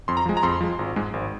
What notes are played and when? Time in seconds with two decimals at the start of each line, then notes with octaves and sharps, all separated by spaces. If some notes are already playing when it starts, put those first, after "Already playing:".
0.08 F2 C6
0.17 A#5
0.26 F3 G#3
0.37 A#5
0.43 F2 C6
0.61 F3 G#3
0.79 G#1
0.96 G#2 G#3
1.14 G#1